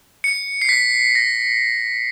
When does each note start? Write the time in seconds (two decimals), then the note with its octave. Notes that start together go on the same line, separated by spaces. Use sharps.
0.24 C#7
0.62 C7
0.69 B6
1.15 A#6